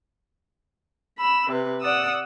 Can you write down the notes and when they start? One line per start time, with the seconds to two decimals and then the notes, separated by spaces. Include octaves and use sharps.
1.19 B5 E6
1.50 C3 B4
1.81 D5 F#5 D#6 E6